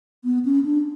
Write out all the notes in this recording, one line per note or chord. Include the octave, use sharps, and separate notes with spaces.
B3
C#4
D4